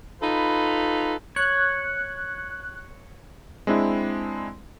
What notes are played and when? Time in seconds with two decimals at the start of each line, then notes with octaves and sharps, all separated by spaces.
0.21 D#4 F4 A4 B4 B5
1.36 C#5 F#6
3.67 G#3 C4 D4 E4